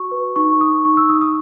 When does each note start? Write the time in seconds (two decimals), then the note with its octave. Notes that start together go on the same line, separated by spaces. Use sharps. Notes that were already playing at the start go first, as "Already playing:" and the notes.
Already playing: F#4 C#6
0.11 B4
0.36 D#4 C#6
0.60 D#4 D#6
0.85 D#4 C#6
0.97 E6
1.09 D#4 D#6
1.21 D#6